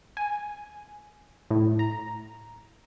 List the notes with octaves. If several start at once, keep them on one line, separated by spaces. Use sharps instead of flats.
G#5
A2
A#5